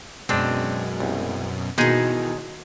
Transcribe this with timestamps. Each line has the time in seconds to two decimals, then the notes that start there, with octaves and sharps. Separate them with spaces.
0.29 F#2 B2 G#3 C4 D4
1.00 C2
1.78 B2 D#3 E3 G#3 D#4 G#4